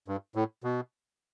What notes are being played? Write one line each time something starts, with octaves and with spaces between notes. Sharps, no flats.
G2
A2
B2